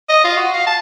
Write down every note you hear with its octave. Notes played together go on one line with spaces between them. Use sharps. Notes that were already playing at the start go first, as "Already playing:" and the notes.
D#5
F4
F#4
F5
A5